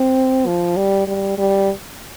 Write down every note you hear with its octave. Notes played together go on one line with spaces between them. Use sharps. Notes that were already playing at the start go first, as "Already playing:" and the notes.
Already playing: C4
F3
G3
G3
G3